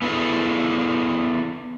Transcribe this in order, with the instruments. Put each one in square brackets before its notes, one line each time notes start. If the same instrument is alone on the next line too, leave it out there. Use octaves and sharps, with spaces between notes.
[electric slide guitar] B3 E4 G#4 A4